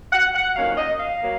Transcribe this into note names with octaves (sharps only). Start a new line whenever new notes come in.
F#5
F#5
F2 D#3 F#3 A#3 C#4 F5
D#5
F5
F#3 A#3